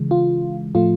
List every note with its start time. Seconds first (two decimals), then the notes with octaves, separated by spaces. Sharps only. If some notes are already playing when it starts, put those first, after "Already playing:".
Already playing: C#3 E3 G#3
0.11 F4
0.75 A2 F3 A3 F4